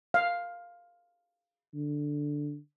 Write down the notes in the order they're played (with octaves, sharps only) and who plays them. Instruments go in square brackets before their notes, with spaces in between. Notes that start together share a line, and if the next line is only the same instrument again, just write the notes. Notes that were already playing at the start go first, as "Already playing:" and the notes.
[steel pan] F5
[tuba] D3